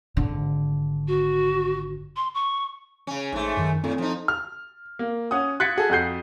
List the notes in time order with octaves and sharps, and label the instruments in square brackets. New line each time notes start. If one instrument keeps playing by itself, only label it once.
[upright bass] G#1 D3
[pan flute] F#4
C6
C#6
[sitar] C#3 C#4
[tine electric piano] A1 [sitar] G#2 A3
[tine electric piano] F#2 D#3
[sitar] A2 [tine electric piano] C4 A4
[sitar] F3 D#4
[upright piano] F6
A#3
C#4 F#5 D#6
F#6 G#6 A6 B6 C#7
F#4 G#4 A4
F2 F#4 F#6 G6 C7